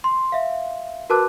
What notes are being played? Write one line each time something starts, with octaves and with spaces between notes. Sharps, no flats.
C6
E5 F5
F#4 A#4 B4 A5 D6 F#6